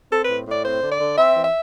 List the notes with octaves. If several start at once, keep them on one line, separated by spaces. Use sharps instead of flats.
C4 A4
A2 B4
A2 D5
C4 C5
D3
D5
D3
C4 E5
E3
E5